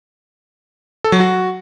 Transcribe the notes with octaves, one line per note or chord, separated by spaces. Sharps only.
A4
F#3
F#4